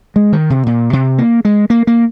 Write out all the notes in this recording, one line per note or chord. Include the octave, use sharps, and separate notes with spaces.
G#3
D#3
C3
A#2
C3
A#3
G#3
A#3
A#3